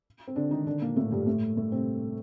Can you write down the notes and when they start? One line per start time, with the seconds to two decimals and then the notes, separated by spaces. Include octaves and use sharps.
0.27 C4
0.36 D3 D4
0.51 D#3 D#4
0.66 D3 D4
0.82 A#2 A#3
0.96 A2 A3
1.11 G2 G3
1.26 A2 A3
1.57 A2 A3
1.72 C3 C4